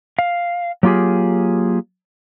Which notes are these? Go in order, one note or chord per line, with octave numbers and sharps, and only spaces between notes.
F5
F#3 A#3 F4 G4 G#4